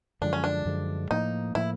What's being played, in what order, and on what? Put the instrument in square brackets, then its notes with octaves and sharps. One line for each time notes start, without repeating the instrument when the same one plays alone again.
[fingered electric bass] F#2 D3 F3 G#3 [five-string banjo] D4
[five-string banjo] C#4
D4
[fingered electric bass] F#2 D3 F3 G#3
[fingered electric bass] A2 F3 A#3 [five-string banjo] D#4
[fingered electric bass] A2 F3 A#3 [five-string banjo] E4